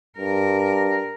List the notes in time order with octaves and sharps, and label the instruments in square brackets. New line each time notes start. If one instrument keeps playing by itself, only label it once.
[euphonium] G2 [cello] A#4